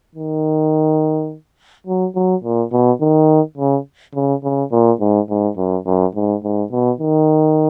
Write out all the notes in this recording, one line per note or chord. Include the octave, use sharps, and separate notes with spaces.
D#3
F#3
F#3
A#2
B2
D#3
C#3
C#3
C#3
A#2
G#2
G#2
F#2
F#2
G#2
G#2
B2
D#3